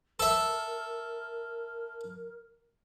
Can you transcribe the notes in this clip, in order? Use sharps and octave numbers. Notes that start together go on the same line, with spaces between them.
A4 A#4 E5